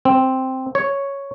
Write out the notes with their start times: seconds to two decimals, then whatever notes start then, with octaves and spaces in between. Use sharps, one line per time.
0.05 C4
0.75 C#5